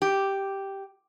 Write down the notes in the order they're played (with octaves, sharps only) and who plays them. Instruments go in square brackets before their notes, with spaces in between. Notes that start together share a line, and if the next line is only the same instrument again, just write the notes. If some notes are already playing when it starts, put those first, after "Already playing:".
[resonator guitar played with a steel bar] G4